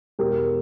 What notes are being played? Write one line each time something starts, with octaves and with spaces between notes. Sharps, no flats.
E1 G4 A#4